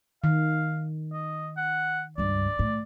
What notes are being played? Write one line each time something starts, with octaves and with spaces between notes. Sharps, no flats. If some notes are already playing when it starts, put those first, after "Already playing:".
D#3 F5
D#5
F#5
C#2 G2 D5
A2